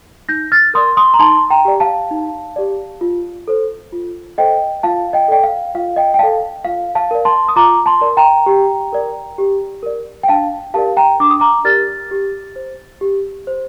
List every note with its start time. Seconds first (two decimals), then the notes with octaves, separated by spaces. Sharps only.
0.29 D#4 G6 A#6
0.52 F6 A6
0.74 A#4 D5 C6 D#6
0.97 C6 D#6
1.14 A#5
1.19 D#4 A5 C6
1.50 G5 A#5
1.65 G4 D5
1.80 F5 A5
2.11 D#4
2.56 G4 D5
3.01 F4
3.48 A4 C5
3.92 F4
4.38 A4 C5 D#5 G5
4.83 F4 F5 A5
5.13 D#5 G5
5.28 A4 D5 G5
5.43 F5
5.75 F4 F5
5.96 D#5 G5
6.14 G5
6.19 A4 D5 F5 A5
6.65 F4 F5
6.95 F5 A5
7.11 A#4 D5
7.25 A5 C6
7.48 D#6
7.56 F4 A#5 D6
7.86 A5 C6
8.01 A#4 D5
8.17 G5 A#5
8.46 G4
8.93 A#4 D5
9.38 G4
9.83 A#4 D5
10.23 G5
10.28 D4 F5 A5
10.74 G4 A#4 D5 F5 A5
10.97 G5 A#5
11.20 D4 D6
11.31 D#6
11.40 A#5 D6
11.65 G4 A#4 D5 F6 A6
12.11 G4
12.56 C5
13.01 G4
13.47 C5